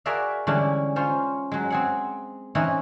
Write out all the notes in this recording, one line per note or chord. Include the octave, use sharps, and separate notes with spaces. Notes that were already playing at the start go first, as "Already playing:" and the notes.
F#4 G#4 A#4 D5 E5 F5
D3 E3 G3 G#3 C#4 D4
C#4 F4 C5
F#3 G#3
C4 G#4 F#5
E3 C4 C#4 D#4 E4